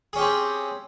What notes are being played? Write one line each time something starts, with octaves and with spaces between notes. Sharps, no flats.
C4 C#4 G4 G#4